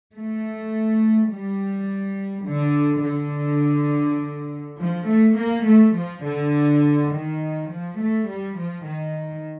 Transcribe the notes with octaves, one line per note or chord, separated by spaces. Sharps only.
A3
G3
D3
D3
F3
A3
A#3
A3
F3
D3
D#3
F3
A3
G3
F3
D#3